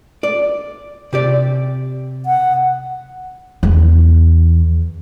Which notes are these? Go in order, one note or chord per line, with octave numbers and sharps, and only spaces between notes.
D5
C3 G4 D5
F#5
E2